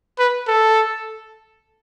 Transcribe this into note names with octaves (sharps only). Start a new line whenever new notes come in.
B4
A4